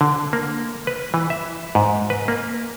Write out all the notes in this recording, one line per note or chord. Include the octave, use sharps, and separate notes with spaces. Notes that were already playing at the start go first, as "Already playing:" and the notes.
D3
A#3
B4
E3
E5
G#2
B4
A#3